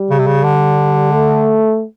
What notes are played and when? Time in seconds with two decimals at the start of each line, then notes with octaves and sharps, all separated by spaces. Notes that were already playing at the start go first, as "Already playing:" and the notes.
Already playing: G3
0.10 C#3
0.19 C3
0.26 C#3
0.44 D3
1.13 A3